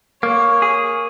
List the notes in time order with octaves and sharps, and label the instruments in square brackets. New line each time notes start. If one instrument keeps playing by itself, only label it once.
[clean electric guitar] A#3 [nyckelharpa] C#5
[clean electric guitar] G#4